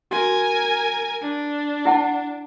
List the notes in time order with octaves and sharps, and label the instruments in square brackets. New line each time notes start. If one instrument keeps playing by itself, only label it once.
[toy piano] F#4 [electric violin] A#4 G#5
[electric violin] D4
[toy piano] E4 F#5 A5